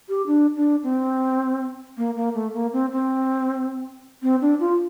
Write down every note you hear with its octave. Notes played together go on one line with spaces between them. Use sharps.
G4
D4
D4
C4
A#3
A#3
A3
A#3
C4
C4
C4
D4
F4